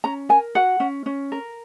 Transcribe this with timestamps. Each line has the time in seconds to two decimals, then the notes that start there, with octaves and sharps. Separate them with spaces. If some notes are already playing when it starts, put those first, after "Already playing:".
0.04 C#4 A#5
0.29 A#4 G#5
0.55 F#4 F#5
0.80 C#4
1.06 C#4
1.32 A#4